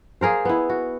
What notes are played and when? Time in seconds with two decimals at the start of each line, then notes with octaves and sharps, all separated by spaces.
0.21 A#3 G#4 A#4 C5
0.45 B3 E4
0.69 F#4